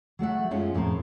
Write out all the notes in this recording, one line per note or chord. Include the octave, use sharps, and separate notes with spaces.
F#3 A3 E5 F#5
F#2 G#3 C#4 F4
F2 A2 A#4 C5